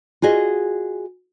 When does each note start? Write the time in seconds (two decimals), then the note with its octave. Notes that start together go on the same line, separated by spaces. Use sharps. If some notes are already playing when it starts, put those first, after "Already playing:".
0.22 F4 F#4 G#4 D#5